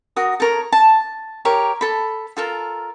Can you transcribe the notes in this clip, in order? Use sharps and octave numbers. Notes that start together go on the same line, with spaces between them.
F#4 A#4 D#6
A4 A#4 C#5
A5
G4 A#4 C#5
A4 B5
F4 A4 A#4